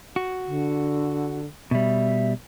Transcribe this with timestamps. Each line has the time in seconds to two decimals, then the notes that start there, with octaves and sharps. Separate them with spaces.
0.16 F#4
0.46 D3
1.71 B2 G3 E5